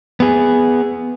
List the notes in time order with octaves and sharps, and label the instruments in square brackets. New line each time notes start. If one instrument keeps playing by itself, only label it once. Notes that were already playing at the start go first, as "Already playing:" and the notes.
[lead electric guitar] B3 G#4